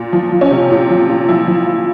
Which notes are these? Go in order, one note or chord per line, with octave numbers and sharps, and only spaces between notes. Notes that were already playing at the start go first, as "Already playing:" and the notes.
Already playing: A#2
F3
F3
C#4
C3
A#2
F3
A#2
F3 E4
F3
F3